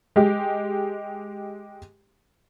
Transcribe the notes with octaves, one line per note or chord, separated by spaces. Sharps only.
G#3 G4